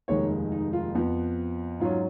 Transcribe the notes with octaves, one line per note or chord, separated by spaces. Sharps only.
F1 D#2 D#3 G#3 C#5
D#4
F4
F2 F3 B3
G#2 F#3 C#4 F4